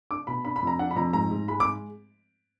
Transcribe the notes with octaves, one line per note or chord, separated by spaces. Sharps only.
D4 D6
B2 B5
D4 B5
B5
F2 A#5
D4 F#5
B5
F2 A#5
G#2 A#5
G#2
G#3 B5
D6